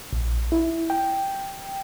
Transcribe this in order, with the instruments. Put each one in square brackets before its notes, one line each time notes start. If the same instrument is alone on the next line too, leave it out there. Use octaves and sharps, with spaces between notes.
[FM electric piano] A#1
E4
G5